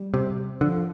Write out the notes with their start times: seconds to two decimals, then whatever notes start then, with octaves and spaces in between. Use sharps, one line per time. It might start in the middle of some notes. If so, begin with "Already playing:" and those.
Already playing: G3
0.14 C3
0.61 D3 F3